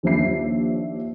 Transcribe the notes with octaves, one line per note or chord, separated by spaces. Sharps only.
D#2 F3 D4 E5 C7